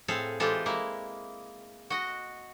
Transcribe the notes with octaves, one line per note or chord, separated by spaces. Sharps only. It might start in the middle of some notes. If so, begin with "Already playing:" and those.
A2 C4 G#4 A4 F5
E3 G#3 F4 G4 A4 C5
G#3 A#3 E4
F#4 D#5